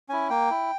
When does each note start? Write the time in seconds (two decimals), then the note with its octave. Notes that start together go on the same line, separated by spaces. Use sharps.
0.09 C#4 E4 G#5
0.30 A#3 G5
0.51 E4